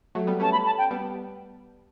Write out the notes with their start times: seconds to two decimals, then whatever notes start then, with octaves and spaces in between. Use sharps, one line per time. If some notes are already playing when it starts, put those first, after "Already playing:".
0.15 F#3 A3
0.27 G3 B3
0.40 A3 C#4 A5
0.52 B5
0.66 A5
0.78 G5
0.91 G3 B3